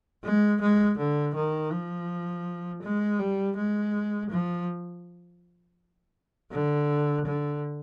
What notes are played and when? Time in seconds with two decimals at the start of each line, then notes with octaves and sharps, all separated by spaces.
0.24 G#3
0.61 G#3
0.98 D3
1.35 D#3
1.72 F3
2.82 G#3
3.19 G3
3.57 G#3
4.30 F3
6.52 D3
7.25 D3